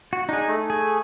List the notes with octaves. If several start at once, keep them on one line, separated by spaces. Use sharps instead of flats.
F#4
D4 D#4 G#4
A3
G#4